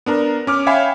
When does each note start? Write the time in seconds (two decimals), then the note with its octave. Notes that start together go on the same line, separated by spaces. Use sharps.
0.06 B3 D4 A#4 A#5
0.47 C#4 D6 F6
0.67 C#5 E5 F5 G5 G#5 B5